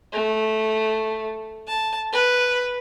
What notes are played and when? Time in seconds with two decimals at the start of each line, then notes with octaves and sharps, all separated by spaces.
0.12 A3
1.67 A5
2.12 B4